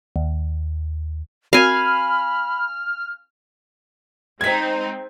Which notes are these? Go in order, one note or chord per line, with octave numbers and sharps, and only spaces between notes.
D#2
C4 F#4 A#4 F5 G#5 B5 F6
G#3 C4 D#4 G#6 B6